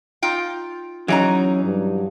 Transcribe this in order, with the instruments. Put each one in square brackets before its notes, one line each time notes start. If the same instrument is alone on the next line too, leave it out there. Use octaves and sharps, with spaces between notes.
[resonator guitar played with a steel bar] D#4 F4 G5
[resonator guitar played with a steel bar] E3 D#4 A#5 [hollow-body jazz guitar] F#3 G#4 [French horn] C#4
[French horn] G2